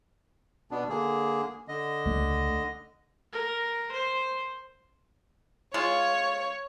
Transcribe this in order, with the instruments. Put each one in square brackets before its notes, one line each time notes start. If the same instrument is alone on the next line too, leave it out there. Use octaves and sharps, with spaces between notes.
[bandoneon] B2 B3 D4
D3 A#3 G#4
D3 D#5
[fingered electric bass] C#2 A3
[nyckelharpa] A#4
C5
[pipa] G#3 F4 [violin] C#5